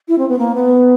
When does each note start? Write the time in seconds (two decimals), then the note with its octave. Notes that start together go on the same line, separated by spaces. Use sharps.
0.08 E4
0.18 C4
0.29 B3
0.39 A#3
0.55 B3